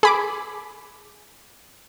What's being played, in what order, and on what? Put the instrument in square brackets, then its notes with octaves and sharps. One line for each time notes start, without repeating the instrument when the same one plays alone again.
[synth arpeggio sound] G#4 B5 D6